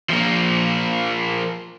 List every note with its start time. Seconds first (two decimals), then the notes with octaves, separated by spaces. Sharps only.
0.10 F3 A#3